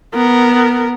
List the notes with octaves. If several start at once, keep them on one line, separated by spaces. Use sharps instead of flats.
B3 A#4